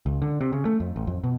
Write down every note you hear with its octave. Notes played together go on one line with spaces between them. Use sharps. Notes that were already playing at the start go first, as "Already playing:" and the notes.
C#2
D3
C3
C#3
A3
F2
A1
F2
B2